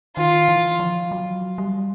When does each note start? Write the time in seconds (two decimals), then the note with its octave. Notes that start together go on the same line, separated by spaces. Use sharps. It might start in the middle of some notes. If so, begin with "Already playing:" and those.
0.16 D#3 F4
0.48 E3
0.80 F3
1.11 F#3
1.58 G3